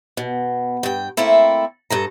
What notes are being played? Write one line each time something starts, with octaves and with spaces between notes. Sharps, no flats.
B2
G2 G5
A3 A#3 C4 E4 A4
G2 A4 A#5